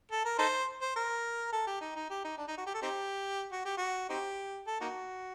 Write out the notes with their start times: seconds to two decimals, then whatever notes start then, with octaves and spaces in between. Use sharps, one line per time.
0.11 A4
0.25 A#4
0.39 D#4 A4 C5
0.81 C5
0.96 A#4
1.53 A4
1.67 G4
1.81 D#4
1.96 D#4
2.10 G4
2.24 D#4
2.38 D4
2.48 D#4
2.57 F#4
2.66 G4
2.74 A4
2.82 C4 D#4 G4
3.52 F#4
3.65 G4
3.77 F#4
4.10 C4 D#4 G4
4.67 A4
4.81 A#3 D#4 F#4